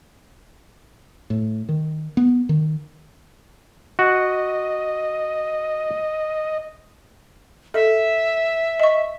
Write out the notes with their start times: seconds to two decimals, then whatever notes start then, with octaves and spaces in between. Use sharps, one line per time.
1.30 A2
1.69 D#3
2.17 B3
2.49 D#3
3.99 F#4 D#5
7.74 A4 E5
8.80 D#5 C#6